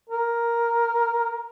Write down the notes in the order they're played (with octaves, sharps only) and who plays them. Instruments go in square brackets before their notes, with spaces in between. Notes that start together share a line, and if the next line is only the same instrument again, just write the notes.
[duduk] A#4